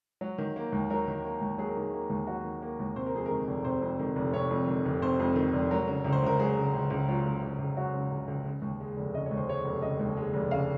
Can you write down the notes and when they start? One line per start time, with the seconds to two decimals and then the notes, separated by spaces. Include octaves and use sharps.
0.21 F#3
0.38 D#3
0.56 A#3
0.72 D#2
0.90 F#3 A#4
1.08 D#3
1.25 A#3
1.41 D#2
1.58 F#3 G#4
1.68 A#4
1.77 D#3 G#4
1.94 A#3
2.10 D#2
2.27 F#3 F#4
2.44 D#3
2.62 A#3
2.80 D#2
2.96 C3 C5
3.06 A#4
3.14 F2 G#4
3.26 D#3 A#4
3.48 F1
3.65 C3 C5
3.81 F2
3.99 D#3
4.16 F1
4.33 C3 C#5
4.51 F2
4.67 D#3
4.85 F1
5.02 C3 C5
5.20 F2
5.36 D#3
5.54 F1
5.71 F#3 A#4
5.87 C#3
6.05 C#2
6.12 C5
6.23 C#2 A#4
6.40 F#3 G#4
6.57 C#3
6.74 C#2
6.90 C#2
7.08 F#3 F4
7.26 C#3
7.42 C#2
7.59 C#2
7.77 F#3 F#4
7.94 C#3
8.11 C#2
8.28 C#2
8.45 C#3
8.62 D#2
8.80 G#3
8.97 F1
9.14 C#3 D#5
9.26 C#5
9.31 D#2
9.37 C5
9.48 G#3 C#5
9.65 F1
9.82 C#3 D#5
9.99 D#2
10.17 G#3
10.33 F1
10.51 C#3 F5